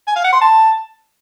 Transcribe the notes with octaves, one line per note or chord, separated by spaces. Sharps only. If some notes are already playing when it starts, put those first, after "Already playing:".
G#5
F5
F#5
C6
A5